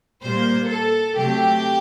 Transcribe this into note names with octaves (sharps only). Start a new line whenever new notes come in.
A#2 G3 A#3 C5
A4
C3 F#3 A3 G4